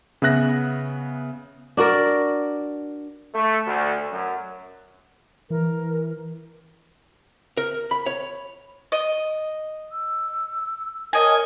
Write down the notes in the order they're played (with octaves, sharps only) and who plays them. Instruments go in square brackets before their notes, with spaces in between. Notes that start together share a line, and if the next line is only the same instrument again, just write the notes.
[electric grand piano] C#3 B3 E5 F#6 A#6
[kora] D4 F#4 A#4 D5
[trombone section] A3
D2
F#2
[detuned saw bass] E3 [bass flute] A#4
[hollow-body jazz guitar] A#4
B5
C#5
[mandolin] D#5
[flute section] E6
[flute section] A#4 C#5 A5 [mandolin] D#5 G#5